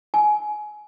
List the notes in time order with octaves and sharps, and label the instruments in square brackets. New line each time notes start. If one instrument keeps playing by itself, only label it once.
[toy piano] G#5